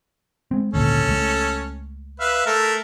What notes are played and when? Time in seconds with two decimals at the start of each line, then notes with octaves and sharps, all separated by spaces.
0.51 G#3 C4
0.74 G#1 D2 A#2 C#4 A4
1.08 C#2 A3
2.20 B4 E5 F5
2.46 A3 A4 A#4